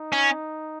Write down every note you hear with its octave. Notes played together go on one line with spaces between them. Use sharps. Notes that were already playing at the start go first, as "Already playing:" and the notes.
Already playing: D#4
C#4